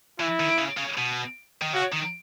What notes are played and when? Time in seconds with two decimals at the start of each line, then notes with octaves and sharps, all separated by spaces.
0.20 E3 E4
0.40 D#3
0.58 C#3
0.77 C#3
0.98 B2
1.62 D#3
1.73 C#3 F#4
1.92 D#3